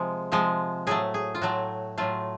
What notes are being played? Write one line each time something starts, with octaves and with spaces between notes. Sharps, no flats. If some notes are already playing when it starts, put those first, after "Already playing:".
Already playing: C3 F3 G#3
C3 F3 G#3
A2 F#3 A3 G#4
G#4
F4
A2 F#3 A3 F#4
A2 F#3 A3 F4